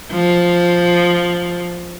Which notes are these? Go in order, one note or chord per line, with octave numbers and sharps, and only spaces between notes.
F3